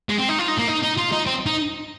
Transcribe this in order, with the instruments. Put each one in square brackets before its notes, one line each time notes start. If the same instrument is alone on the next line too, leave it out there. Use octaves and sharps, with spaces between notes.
[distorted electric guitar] G#3
C4
D#4
F4
D#4
A#3
D#4
D#4
F4
D#4
C4
D#4